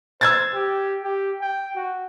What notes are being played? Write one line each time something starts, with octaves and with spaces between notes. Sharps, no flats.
C5 E6 G#6 A6
G4
G4
G5
F#4